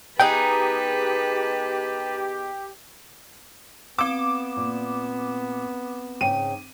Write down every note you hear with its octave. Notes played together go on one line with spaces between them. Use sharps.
B3 D#4 G4 G#4 B4 G5 A5
B3 C4 D6 E7
A#2
G#2 C#3 G5 D#7